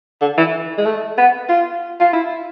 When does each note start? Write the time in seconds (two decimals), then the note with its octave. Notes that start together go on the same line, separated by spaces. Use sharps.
0.21 D3
0.37 E3
0.78 G#3
0.86 A3
1.18 B3
1.49 F4
2.00 F4
2.13 E4